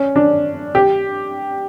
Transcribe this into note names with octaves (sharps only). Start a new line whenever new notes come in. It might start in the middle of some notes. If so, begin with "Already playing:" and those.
Already playing: C#4
D4
G4